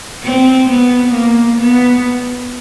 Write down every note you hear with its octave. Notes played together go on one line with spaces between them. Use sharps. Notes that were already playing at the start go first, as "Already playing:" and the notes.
C4
B3
A#3
B3